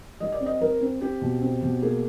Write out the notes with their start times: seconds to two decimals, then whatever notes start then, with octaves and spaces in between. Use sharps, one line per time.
0.20 G3 D#5
0.32 D5
0.40 C4
0.46 D#5
0.61 G3 A#4
0.80 C4
1.01 C4 G4
1.21 B2
1.41 C4
1.62 B2
1.82 A#3 G#4